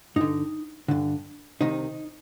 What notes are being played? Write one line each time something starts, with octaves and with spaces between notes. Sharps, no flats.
G2 D3 D#4
G2 D3
C2 C3 D#3 D#4